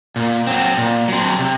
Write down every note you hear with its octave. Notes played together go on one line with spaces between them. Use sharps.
A#2
F#3 C4
A#2
F#3 C4
C3